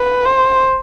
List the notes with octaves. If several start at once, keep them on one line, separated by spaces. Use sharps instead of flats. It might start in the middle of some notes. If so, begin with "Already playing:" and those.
Already playing: B4
C5